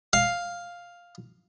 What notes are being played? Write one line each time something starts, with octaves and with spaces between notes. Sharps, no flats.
F5